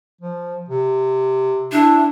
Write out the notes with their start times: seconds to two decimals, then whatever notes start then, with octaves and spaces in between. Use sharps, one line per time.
0.21 F3
0.69 C3
1.72 D4 E4